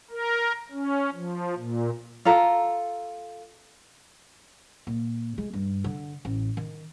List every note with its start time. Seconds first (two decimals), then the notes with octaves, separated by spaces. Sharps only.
0.11 A#4
0.71 C#4
1.13 F3
1.56 A#2
2.25 F4 A4 A#5
4.87 A#2
5.38 G#3
5.53 G2
5.84 D3
6.25 A1
6.57 D#3